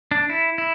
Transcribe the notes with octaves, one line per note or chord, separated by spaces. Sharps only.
D4
E4
E4